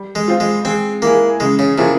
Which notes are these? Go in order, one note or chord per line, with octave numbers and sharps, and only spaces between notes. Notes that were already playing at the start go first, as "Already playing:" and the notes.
Already playing: G3
G#3
C4 F4
G#3
G#3 C4
A#3 E4 G#4
C#3 G#3
C#3
C3 F3 A#3 E4 G#4